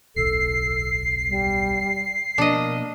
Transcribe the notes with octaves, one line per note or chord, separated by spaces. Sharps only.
D1 B1 E2 A4 C7
G3
B2 F3 A#3 D4 D#5